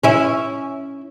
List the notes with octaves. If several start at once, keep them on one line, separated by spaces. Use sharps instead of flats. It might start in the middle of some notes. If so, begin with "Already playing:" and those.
C#4 E4